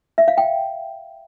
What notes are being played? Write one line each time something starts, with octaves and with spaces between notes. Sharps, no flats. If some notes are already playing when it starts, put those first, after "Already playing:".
E5
F5
G5